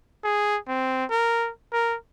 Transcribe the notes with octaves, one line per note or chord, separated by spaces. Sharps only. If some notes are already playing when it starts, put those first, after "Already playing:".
G#4
C4
A#4
A#4